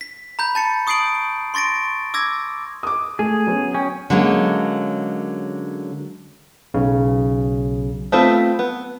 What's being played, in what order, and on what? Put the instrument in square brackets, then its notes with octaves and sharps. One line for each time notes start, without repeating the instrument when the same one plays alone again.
[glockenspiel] B6
A#5 B5 G6
A5 A6 C#7
C#6 D#6 G6 C7 D7 F#7
C6 C#6 A6 A#6 D7
D6 E6 G#6 A#6
[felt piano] D6 D#6
[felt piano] A3 [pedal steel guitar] G#4
[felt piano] F#3 B3 C#4
[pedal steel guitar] C#4 [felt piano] G5
[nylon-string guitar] D3 F#3 G#3 A#3 C#4
[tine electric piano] B1 C#3
[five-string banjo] A3 B3 C4 F4 A4
B3